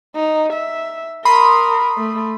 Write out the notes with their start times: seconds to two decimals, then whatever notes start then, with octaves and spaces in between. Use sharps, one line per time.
0.15 D#4
0.53 E5
1.25 A#4 B5 C6 D#6
1.97 A3